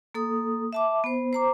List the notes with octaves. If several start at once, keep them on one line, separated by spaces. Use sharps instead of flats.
A#3 A4 D#6
E5 A5 D6
B3 C5
C5 A#5 D6